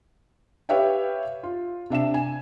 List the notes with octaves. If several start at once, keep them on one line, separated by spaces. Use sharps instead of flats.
G4 B4 C#5 E5 F5 G5
F4
C3 D4 E5 E7
G#5